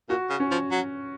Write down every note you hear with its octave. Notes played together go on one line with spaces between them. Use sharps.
A#2 F#4
C#3
C#4
F3
F#3